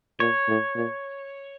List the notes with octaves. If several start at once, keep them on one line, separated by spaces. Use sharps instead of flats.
A#2 C#5
A2
A#2